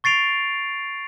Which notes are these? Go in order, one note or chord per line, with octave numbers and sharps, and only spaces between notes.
C#6 A6 C7 D7 F7